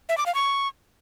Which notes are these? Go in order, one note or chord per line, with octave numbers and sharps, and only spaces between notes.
E5
D6
F5
C#6